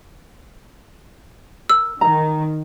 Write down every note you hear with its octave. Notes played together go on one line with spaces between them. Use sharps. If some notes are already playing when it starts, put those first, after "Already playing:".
A#4 E6
D#3 D#5 A#5